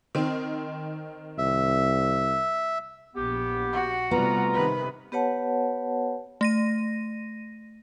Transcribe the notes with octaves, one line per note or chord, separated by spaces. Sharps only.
D#3 C4
C2 E5
A#1 B3 G4
F#4
C3 G3 A3 B3 F4 A#5
C3 D#3 B4
B3 G4 B4 C#5 F#5 A5
A3 A#6 D#7